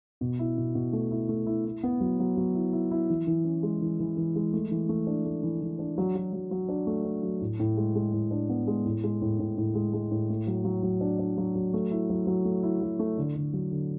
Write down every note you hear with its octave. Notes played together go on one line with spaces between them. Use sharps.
B2
E4
B2
B2
A3
E4
A3
E4
E4
B3
F#3
F#3
F#3
E4
E4
E4
E3
E3
C#4
G#3
E3
E3
E3
G#3
A3
E3
A3
D4
A3
E3
E3
D4
F#3
F#3
F#3
F#3
D4
A3
D4
F#3
A2
A2
G#3
G#3
A2
D4
B3
G#3
A2
G#3
A2
A2
A2
G#3
G#3
A2
A3
F#3
F#3
F#3
D4
D4
F#3
F#3
A3
E4
F#3
F#3
A3
E4
F#3
A3
D3
D3
F#3
D3